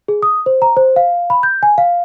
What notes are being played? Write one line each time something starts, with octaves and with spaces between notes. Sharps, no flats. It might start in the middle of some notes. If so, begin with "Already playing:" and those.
G#4
D#6
C5
A#5
C5
F5
B5
G6
G#5
F5